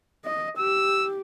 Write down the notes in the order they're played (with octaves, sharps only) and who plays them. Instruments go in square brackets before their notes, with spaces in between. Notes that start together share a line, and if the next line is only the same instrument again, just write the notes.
[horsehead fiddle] D#5
[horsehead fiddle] G4 [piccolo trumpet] E6